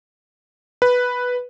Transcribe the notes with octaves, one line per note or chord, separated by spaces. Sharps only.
B4